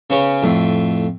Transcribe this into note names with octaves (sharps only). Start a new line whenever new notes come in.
C#3 B3 C#4
F2 A2